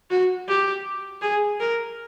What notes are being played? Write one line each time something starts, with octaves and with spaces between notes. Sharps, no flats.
F#4
G4
G#4
A#4